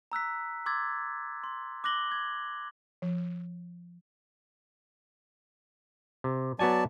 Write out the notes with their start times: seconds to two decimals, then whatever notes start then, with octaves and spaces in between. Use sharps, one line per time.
0.12 A#5 E6 F#6 B6
0.66 C6 D6 E6 G#6 A6
1.44 C6
1.84 D6 F#6 A#6 F#7 G7
2.12 G#6
3.02 F3
6.24 C3
6.59 F#3 B3 F#4 D5 G#5 A5